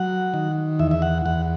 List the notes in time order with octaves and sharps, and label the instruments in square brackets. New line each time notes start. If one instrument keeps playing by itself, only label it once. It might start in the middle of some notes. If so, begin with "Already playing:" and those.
Already playing: [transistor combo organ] F#3 F#5
D#3
E2 E5
E5
F#5
E2 F#5